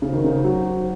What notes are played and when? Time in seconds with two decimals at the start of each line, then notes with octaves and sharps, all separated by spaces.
0.02 C#3 D#4 F#4 C5
0.13 D#3
0.24 C#3
0.44 F#3